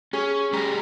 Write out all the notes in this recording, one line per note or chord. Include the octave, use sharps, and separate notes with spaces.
C#4 G#4 C#6
G#3 G4 A#5